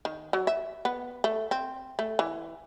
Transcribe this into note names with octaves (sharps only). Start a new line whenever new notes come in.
D#3
F#3
E5
B3
A3
C4
A3
E3